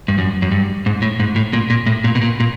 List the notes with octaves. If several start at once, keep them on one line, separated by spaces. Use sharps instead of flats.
G2
F#2
F#2
G2
G#2
A2
G#2
A2
A#2
A#2
A2
A#2
B2
A#2
A#2